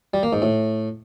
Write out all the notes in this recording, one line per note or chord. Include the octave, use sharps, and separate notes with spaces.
G3
A#3
G#2
A2